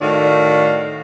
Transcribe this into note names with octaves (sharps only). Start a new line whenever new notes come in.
A2 D#3 F#4 D5 F5